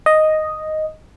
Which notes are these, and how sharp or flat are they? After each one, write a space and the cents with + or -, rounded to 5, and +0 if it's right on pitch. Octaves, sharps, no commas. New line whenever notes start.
D#5 +0